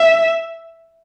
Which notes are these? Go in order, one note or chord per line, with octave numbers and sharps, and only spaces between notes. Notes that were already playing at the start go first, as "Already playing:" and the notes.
Already playing: E5